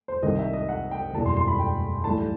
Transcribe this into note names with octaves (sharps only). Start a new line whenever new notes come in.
C5
C2 C3 D#3 D#5
E5
D#5
F#5
G5
F#1 E2 B2 G3 A5
C6
C6
B5
G5
B1 A2 E3 G3 A5